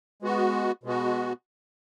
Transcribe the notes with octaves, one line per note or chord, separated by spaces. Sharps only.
G#3 B3 F#4
B2 G#3 B3 F#4